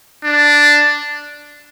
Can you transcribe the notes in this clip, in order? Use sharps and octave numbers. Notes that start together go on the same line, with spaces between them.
D4